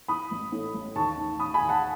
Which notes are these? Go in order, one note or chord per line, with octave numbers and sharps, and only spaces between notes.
E3 B5 D#6
A1
A2
A1
D#2 A5 C#6
D#3
D#3 B5 D#6
G#5 B5
D#2
F#5 A5